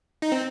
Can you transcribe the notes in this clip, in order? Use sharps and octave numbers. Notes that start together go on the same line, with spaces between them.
D#4
C4